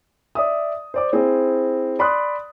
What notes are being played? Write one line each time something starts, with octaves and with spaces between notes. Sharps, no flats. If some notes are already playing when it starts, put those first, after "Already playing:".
D5 E5 D#6
C5 D5 D6
C4 E4 G#4 C5
D5 B5 C6 D#6 F#6